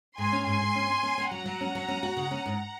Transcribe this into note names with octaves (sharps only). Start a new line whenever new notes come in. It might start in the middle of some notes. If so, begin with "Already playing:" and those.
G#2 G#5 C6
C#4
G#2 G#5 C6
G#2
C#4
C#4
C#4
C#4
F#3 F#5 A#5
F#3
C#4
F#3
C#4
F#4
C#3
C#4
G#2